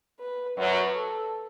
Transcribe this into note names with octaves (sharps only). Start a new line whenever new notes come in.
B4
F#2 F#3 B4
A4